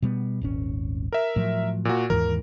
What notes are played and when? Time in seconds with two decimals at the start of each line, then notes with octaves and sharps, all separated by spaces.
0.02 B2 G3 B3
0.41 D#1 G#1 C#4
1.13 A#4 E5
1.36 A2 F3 F#3
1.85 A#2 F#4
2.10 D#2 G#2 E3 A#4